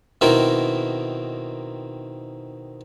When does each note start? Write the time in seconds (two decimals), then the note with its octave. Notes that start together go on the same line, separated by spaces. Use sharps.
0.21 B2 D#3 C4 E4 A#4